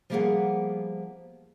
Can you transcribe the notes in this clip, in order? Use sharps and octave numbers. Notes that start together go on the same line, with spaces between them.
F3 G3 A#3 B3 G#4 F#5